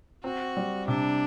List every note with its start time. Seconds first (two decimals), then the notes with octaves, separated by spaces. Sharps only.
0.24 C4 F#4
0.57 G3
0.88 C3 D4